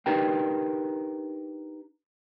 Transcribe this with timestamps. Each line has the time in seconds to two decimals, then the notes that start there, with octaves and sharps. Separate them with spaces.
0.06 D4 D#4 G4 A#4 B4 G5